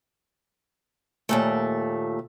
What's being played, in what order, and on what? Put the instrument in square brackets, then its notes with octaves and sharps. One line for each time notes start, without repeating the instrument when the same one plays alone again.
[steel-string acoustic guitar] D#2 A#2 A3